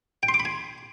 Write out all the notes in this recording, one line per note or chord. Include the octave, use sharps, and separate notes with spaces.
G5
C6
D6
B5
G#5